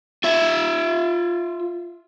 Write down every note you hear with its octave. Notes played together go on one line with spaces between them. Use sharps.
F4 E5